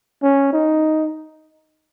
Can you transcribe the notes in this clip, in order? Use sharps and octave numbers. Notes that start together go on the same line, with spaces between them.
C#4
D#4